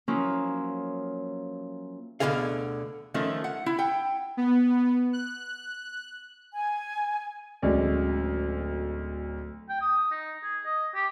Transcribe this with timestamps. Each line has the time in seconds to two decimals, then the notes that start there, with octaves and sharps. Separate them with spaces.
0.08 F3 F#3 A#3 C#4 D#4 E4
2.20 D2 G#2 B2 D3 G#4 F5
3.14 D#3 F3 A3 C#4
3.44 F#5
3.66 E4
3.78 F#5 G5
4.37 B3
5.13 F#6
6.52 G#5
7.62 D1 D2 G#3 C#4 D5
9.69 G5
9.81 D#6
10.11 D#4
10.43 G#4
10.65 D#5
10.95 G4